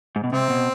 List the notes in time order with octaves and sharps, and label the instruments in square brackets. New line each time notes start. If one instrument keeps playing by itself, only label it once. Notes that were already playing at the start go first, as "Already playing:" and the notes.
[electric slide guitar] G#2
B2
[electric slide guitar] C3 [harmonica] C4
[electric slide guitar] B2